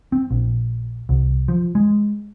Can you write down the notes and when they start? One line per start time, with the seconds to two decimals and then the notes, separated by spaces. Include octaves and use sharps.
0.12 C4
0.31 A#1
1.09 C2
1.48 F3
1.75 G#3